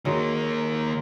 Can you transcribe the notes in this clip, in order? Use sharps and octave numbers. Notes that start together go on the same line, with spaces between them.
D#3 F#3 G#3 A#3